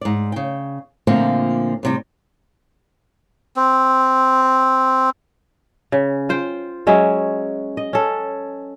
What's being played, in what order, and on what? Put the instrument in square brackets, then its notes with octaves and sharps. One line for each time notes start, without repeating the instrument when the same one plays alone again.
[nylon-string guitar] G#2 D5
C#3 G5
A#2 D3 F3 A3 A#3 C4
A2 C3 G3
[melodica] C4
[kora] C#3
F4 C5 G5
F#3 G#3 C#4 E5
D#5
C#4 A4